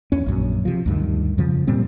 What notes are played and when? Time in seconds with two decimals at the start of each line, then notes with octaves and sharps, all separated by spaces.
0.12 E2 C#4
0.26 A#1 F#2
0.65 C3 F3
0.86 D2 G2 D#3
1.38 F2 C#3 F3
1.67 F2 A#2 G3 C4